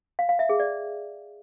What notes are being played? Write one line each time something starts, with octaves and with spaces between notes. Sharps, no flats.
F5
F5
E5
G#4
D5